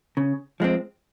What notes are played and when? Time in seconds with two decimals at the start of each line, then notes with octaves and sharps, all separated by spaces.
0.17 C#3
0.60 F3 G#3 C4